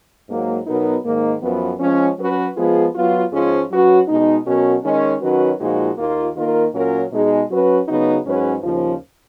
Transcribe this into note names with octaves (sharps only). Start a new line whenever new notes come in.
G#2 F#3 A#3
B2 F#3 B3 D#4 A#4
G#2 D#3 A#3
F#2 F3 B3
F3 G#3 C#4
F#3 C#4 F#4 B4
F3 G#3 B3 F4 G#4
F#3 B3 F4
G#2 F3 G#3 C#4 F4
F#3 C#4 F#4 B4
B2 G#3 D#4
B2 F#3 C#4 F#4 A#4
D#3 G#3 C#4
D#3 F#3 C#4 F#4 B4
A#2 F3 G#3 D#4 F#4
D#2 D#3 A#3 F4
D#3 A#3 F4 A#4
A#2 F#3 C#4 F4 A#4
B2 G#3 D#4 G#4
F#3 C#4 F#4 B4
C#3 F#3 B3 D#4 F#4
G#2 F#3 C#4 G#4 B4
D#2 C#3 F3